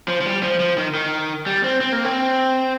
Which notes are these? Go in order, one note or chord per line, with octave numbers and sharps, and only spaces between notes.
F3
F3
G3
F3
F3
D#3
D#3
G3
C4
C4
A#3
C4